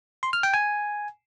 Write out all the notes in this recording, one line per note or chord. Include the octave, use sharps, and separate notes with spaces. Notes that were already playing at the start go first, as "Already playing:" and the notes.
C6
F6
G5
G#5